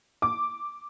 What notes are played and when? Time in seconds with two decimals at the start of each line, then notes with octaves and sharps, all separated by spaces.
0.22 D6